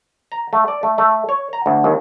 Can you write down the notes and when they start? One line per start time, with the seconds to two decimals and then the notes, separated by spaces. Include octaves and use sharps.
0.32 A#5
0.53 A3
0.68 D5
0.83 A3
0.98 A3
1.29 C#5
1.53 A#5
1.66 D2
1.84 D#2